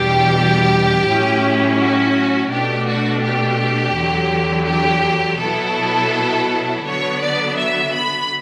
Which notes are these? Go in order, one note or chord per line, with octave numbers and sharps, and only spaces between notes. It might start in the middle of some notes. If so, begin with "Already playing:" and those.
Already playing: E2 B2 G3 D4 G4
A2 F#3 C#4 E4
F#4
B2 A3 D4 G4
F#4
G4
E2 D3 F#3
G4
B2 F#3 B3 E4 A4
D3 F#3 B3 C#5
D5
E5
B5